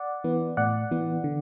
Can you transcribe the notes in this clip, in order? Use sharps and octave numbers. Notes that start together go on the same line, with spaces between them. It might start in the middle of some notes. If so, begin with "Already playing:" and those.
Already playing: D5 F#5
E3 B3
A2 D5 F#5
E3 B3
D3